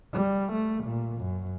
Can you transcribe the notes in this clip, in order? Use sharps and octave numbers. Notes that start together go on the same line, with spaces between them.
G3
A3
A#2
F#2